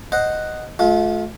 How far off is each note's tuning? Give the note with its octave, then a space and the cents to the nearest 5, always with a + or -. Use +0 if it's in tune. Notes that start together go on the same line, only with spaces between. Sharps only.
C5 +0 D#5 +0 F#5 +0
A3 -35 F4 +25